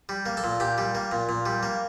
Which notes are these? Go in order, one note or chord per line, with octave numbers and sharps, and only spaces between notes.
G3
A#3
A4
A#2
A#2 G4
G3
A#3
A#2
A#2
G3
A#3